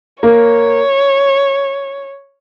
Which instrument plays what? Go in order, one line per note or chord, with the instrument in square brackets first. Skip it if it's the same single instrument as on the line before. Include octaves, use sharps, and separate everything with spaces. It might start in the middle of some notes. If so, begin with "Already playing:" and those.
[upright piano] A#3 [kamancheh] C#5